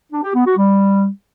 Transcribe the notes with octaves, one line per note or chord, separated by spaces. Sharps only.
D4
G4
B3
F#4
G3